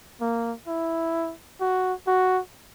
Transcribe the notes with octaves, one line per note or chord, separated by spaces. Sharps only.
A#3
E4
F#4
F#4